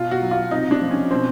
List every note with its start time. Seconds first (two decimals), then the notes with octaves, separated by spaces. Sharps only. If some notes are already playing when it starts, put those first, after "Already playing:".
Already playing: B2 F4
0.11 F#4
0.22 F#3
0.31 F4
0.51 C3 D#4
0.71 D4
0.82 F3
0.91 C#4
1.11 B2 C4